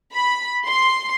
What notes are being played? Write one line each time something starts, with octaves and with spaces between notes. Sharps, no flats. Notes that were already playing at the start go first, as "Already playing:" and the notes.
B5
C6